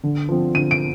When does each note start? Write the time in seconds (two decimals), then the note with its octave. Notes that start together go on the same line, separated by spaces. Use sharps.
0.04 D3
0.29 F3 C4
0.55 D3 D#7
0.71 D7